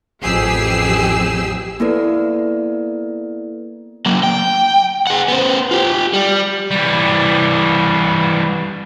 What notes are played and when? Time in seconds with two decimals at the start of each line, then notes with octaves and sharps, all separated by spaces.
0.21 A1 F2 G4 G#4 E6 C7
1.80 A#3 B3 E4 A4 B4 D5
4.06 F#3 A#3
4.23 G5
5.07 G#4 F#5
5.28 B3 C5
5.71 F4 G4
6.13 G3
6.71 E3 G3